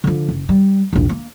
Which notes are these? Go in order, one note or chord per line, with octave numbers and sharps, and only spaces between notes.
D3 F3
F#1
G3
A#1 E2
A#3